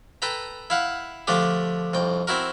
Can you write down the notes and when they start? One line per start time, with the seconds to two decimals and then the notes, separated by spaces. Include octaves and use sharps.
0.22 A4 B4 G5 A#5
0.70 E4 F5 F#5
1.27 D3 F3 A3 D4 G4
1.93 C2 F2 G5
2.27 C4 E4 F#4 A#4